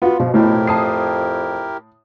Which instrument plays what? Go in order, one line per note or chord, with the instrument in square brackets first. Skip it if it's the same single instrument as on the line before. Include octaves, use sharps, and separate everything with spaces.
[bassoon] B3 [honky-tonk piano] F4 F#4
[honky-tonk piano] B2 [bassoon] F3
[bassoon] F2 [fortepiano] A2 [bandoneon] E4 G4 A#4
[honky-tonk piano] A5 D#6 C7